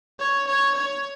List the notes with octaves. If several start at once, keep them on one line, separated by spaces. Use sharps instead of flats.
C#5
C#5
C#5